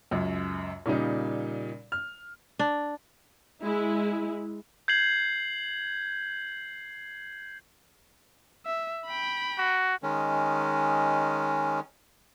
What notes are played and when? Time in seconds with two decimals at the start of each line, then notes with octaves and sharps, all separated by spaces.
0.11 C#2 F#2
0.86 A#2 C#3 G3 D#4
1.92 F6
2.59 D4
3.62 G#3 E4
4.88 G6 G#6 C7 F#7
8.66 E5
9.06 G5 B5
9.58 F#4
10.03 D#3 G#3 C#4